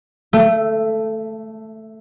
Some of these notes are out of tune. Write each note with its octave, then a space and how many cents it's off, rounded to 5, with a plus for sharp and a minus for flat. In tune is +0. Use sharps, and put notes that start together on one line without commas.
A3 +0 E5 +40 E6 +0